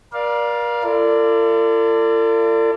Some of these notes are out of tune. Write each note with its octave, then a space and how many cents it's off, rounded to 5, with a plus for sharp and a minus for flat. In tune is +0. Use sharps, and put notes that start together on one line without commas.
A#4 +40 D5 +0 F5 +0
F4 -40 A4 +45 D5 +0